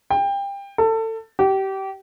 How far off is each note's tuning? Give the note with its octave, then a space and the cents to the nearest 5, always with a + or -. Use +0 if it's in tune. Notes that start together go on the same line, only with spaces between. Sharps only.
G5 +25
A4 +25
G4 -25